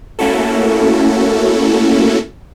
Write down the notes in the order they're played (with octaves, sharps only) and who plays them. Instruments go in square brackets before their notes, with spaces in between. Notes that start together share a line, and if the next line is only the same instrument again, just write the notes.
[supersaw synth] A3 A#3 C#4 E4 F#4 A4